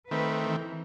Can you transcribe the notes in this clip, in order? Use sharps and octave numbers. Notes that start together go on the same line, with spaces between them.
D#3 A3 C4 B4
E3